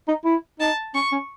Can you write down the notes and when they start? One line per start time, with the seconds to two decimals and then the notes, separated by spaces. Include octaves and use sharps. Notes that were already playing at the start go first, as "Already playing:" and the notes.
0.08 D#4
0.25 E4
0.60 D#4 A5
0.94 C#4 C#6
1.12 C#4